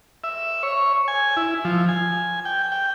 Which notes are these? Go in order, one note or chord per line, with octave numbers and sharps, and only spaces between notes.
E5
C#5
G#5
E4
F3
G#5
G5
G5